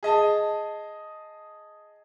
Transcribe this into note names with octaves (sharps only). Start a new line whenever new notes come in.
G#4 D#5 A5